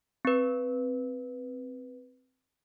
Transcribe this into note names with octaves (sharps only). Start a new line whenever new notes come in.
C4 B4